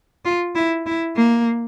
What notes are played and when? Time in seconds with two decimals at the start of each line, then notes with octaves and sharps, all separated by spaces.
0.25 F4
0.55 E4
0.86 E4
1.16 A#3